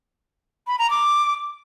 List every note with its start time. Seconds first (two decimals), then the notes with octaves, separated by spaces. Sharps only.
0.67 B5
0.79 A#5
0.90 D6